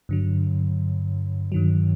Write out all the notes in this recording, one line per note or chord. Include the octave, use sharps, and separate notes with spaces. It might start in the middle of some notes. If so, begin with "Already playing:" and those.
G2 D3 F#3
G2 D#3 F#3